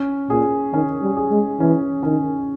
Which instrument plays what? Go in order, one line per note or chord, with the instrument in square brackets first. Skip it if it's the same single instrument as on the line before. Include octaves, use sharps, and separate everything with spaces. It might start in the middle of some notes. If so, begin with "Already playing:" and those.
Already playing: [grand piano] C#4
[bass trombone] A#2 [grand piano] G#4
[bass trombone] D#3 [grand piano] C#4
[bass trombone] G3
[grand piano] G#4
[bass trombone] G#3
[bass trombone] E3 [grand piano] C#4
[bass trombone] D#3 [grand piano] C#4